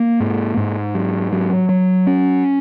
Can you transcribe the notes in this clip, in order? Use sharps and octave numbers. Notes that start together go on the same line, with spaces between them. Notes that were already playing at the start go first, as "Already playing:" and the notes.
Already playing: A#3
G#2
G#2
F#3
F#3
F#3
C#4